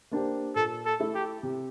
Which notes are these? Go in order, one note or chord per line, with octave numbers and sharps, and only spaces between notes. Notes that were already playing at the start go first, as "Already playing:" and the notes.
A#3 D4 G4 C5
A#2 A4
A4
A3 E4 A4
G4
C3